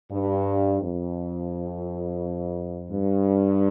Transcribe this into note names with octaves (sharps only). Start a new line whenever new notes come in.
G2
F2
G2